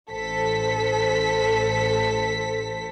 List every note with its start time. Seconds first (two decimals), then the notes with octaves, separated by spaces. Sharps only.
0.13 A1 A4 C5 B6